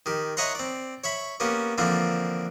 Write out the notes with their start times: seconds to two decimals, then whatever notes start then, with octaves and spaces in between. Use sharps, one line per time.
0.06 D#3 G4
0.37 C#5 D#5 E5 F#5 A#5 C6
0.55 C4 D5
1.04 C#5 E5 B5
1.40 A#3 B3 C#4 G4
1.78 D3 E3 F3 A#3 C4 D4